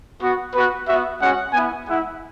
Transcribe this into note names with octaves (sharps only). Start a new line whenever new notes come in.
B3 F#4
B3 F#4 B4
B3 F#4 E5
G#3 C#4 F#4 F#5
B3 E4 G#5
G#3 E4 F#5